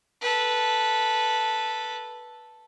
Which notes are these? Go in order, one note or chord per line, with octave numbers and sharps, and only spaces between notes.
A4 B4